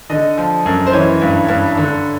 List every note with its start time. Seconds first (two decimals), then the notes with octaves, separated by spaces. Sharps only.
0.10 D3 D#5
0.38 F3
0.66 F#2
0.86 C5
0.93 E3 C#5
1.21 G2
1.48 G2
1.77 D3